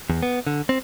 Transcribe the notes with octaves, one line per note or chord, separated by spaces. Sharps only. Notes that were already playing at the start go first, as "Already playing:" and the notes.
E2
B3
D3
C4